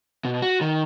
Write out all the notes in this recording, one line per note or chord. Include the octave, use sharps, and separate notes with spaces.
B2
F#4
D#3